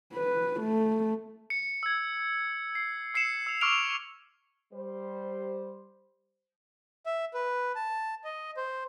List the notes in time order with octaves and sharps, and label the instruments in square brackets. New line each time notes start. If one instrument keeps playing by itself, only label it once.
[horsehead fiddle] B4
A3
[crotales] C#7
E6 G#6
C7
E6 C7 C#7 E7
E6 F7
C#6 D6 E6 F6 D7 F7
[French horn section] G3 C5
[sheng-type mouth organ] E5
B4
A5
D#5
C5